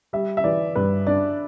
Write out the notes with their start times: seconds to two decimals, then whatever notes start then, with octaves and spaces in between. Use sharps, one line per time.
0.13 G3 E5
0.37 E5
0.44 E3 D5
0.75 G2 B4
1.07 D4 D5